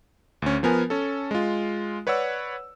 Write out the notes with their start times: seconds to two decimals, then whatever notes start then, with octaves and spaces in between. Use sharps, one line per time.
0.42 D2 C#4
0.63 F3 B3 A#4 G#5
0.90 C#4 A4
1.31 G#3 F4
2.07 B4 C#5 D5 F#5 E6